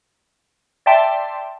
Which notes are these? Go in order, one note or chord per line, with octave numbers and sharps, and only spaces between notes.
D5 E5 G5 A5 C6